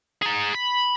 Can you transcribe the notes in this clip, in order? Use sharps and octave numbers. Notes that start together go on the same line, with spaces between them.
G#4 A#5
B5